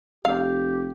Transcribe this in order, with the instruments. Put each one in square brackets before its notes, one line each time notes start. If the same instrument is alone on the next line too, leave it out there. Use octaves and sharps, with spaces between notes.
[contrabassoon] F1 [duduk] G4 [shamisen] F5